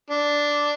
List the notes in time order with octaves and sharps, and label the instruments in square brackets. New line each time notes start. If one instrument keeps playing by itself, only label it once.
[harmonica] D4